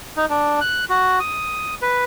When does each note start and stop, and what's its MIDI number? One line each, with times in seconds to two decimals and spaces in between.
0.17 0.26 63
0.30 0.60 62
0.61 0.85 90
0.90 1.19 66
1.20 1.75 87
1.82 2.04 71